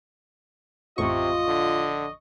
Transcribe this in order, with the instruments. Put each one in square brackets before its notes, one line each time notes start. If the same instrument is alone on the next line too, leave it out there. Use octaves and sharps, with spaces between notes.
[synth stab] A1 F2 C#6 [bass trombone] C3 [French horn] F4 [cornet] D#5
[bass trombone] D3